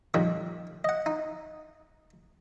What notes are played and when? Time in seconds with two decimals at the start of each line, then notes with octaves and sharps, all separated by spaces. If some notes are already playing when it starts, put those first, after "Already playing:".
0.14 F2 A#2 D#3 G3 A#3
0.84 D#5 F#5
1.06 D#4